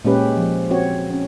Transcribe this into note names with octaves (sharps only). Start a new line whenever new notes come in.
A#2 G#3 C#4 G4 B4
F3
C4 F#4 C#5
C#4